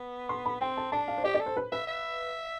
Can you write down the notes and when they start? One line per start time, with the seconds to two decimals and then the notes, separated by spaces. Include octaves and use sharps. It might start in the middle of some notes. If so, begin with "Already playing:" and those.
Already playing: B3
0.29 C6
0.45 B5
0.61 C4 G5
0.77 A5
0.92 D4 A5
1.08 F5
1.18 C5
1.24 G4 D5
1.34 D5
1.40 A4
1.46 C5
1.57 B4
1.72 B4 E5
1.87 E5